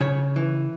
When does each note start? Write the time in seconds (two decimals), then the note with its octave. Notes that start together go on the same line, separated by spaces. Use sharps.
0.01 C#3 C#5
0.36 E3